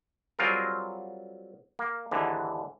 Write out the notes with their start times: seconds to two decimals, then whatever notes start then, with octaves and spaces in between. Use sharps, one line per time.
0.39 F#3 G3 C4 F4 G#4 A#4
1.79 A#3
2.11 D#2 G#2 D3 E3